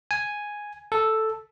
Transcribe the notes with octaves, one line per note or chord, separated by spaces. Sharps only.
G#5
A4